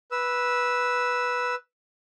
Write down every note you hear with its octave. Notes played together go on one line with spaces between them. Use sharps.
B4 E6